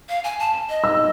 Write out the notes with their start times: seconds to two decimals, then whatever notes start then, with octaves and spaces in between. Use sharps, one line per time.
0.09 F5
0.24 G#5
0.40 A5
0.69 D#5
0.84 E6